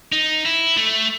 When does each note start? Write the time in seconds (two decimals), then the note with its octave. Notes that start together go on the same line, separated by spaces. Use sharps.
0.12 D#4
0.46 E4
0.77 A3